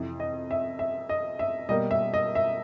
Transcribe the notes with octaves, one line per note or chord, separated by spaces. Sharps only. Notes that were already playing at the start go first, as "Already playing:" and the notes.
Already playing: F2 C3 E3
D#5
E5
E5
D#5
E5
B2 G3 A#3 D#5
E5
D#5
E5